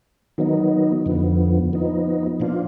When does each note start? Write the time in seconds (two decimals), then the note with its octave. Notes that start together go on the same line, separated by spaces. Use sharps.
0.38 D#3 F#3 B3 D#4
1.06 F2 D3 F3 B3
1.73 F3 B3 D#4
2.40 A#2 F3 B3 D4 F4